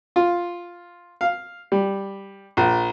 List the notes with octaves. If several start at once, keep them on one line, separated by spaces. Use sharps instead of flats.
F4
F5
G3
A#1